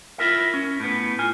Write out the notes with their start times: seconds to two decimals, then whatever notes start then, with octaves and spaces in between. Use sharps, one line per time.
0.18 E4 F4 A#4 E5
0.54 C#4
0.80 A2 B3
1.19 A2 F4 G#5